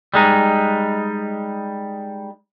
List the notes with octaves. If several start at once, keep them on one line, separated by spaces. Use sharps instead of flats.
G3 G#3 D#4